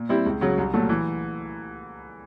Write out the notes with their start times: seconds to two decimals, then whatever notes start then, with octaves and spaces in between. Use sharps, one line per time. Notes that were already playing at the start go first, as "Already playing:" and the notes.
Already playing: A#2
0.09 G3 C4 E4
0.26 C#2
0.41 C#3 F#3
0.58 C2
0.74 A#2 F#3 A3
0.89 E3